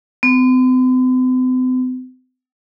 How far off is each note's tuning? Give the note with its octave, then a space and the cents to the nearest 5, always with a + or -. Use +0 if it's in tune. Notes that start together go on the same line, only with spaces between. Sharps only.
C4 -45